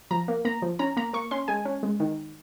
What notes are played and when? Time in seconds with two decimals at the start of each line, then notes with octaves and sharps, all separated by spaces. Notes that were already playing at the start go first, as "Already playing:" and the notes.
0.11 F3 A#5
0.28 A#3
0.45 A#3 A#5
0.62 F3
0.79 C#4 A#5
0.97 A#3 A#5
1.13 A#3 C#6
1.31 C#4 C6
1.48 G#3 G#5
1.65 C#4
1.83 G#3
2.00 D#3